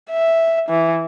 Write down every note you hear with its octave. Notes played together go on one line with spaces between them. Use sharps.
E5
E3